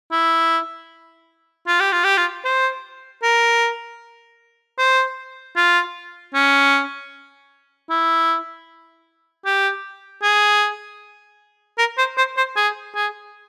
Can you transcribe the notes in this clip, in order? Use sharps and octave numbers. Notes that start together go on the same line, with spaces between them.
E4
F4
G4
F4
G4
F4
C5
A#4
C5
F4
C#4
E4
G4
G#4
A#4
C5
C5
C5
G#4
G#4